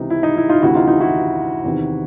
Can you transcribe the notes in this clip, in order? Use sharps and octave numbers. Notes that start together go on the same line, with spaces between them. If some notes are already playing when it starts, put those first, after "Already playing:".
Already playing: C#2 C3 E3 D#4
E4
D#4
E4
D#4 F4
D2 C3 E3 E4 F#4
D#4 F4
D#4 F4
E4 F#4
E2 C3 D#3